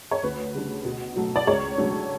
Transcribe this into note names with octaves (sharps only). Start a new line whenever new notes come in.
C#5
D2 B4
C#3 G3 D4
B2
F#3 A3
D5
C#2 C#5
C#3 F#3 A3 D4